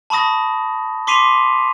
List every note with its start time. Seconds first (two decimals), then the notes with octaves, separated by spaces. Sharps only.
0.10 A5 B5 C#6 D#6 A#6
1.07 C6 D6 B6 C7 D#7 F7